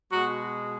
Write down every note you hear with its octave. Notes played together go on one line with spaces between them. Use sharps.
B2 G#3 F#4